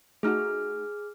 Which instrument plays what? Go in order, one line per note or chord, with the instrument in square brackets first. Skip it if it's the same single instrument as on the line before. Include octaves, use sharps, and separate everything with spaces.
[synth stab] A3 D#4 F#4 [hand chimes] G#4 F6